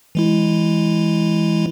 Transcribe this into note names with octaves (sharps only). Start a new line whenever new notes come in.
E3 G#3 E4